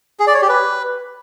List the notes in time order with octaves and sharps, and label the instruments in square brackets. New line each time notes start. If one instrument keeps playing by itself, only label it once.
[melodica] G#4
D5
C#5
G4
B4